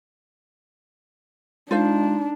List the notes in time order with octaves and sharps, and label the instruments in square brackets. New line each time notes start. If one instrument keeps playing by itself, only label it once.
[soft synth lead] G#3 [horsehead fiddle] D4 [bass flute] D#4 [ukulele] F4 C5 F5